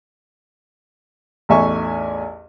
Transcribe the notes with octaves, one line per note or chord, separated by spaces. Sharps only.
A1 E2 D#4 E5 G#5 C#6